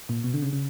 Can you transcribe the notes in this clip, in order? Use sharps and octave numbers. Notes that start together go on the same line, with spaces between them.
A#2
B2
D3
C#3
C#3